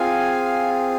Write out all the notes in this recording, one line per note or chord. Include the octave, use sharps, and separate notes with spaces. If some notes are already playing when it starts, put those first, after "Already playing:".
Already playing: C4 F4 G#4 F5 G#5